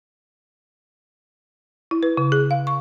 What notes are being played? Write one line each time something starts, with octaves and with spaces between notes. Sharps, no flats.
E4
B4
C#3
G#4
F5
C#6